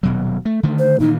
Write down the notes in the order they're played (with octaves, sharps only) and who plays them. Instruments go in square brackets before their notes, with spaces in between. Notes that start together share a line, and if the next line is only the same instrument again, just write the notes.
[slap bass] D#1 B2 F#3
A3
D3 D#3 A3
[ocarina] C5
[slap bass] A#2 D#3 E3 [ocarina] D#4